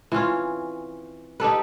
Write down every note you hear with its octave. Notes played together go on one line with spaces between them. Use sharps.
E3 C4 C#4 F4
D#4 G4 A4 B4